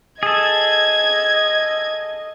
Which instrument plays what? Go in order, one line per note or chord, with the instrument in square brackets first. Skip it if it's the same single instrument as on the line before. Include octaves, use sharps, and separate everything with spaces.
[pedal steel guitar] G#4 A4 [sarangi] D#5 [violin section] G#6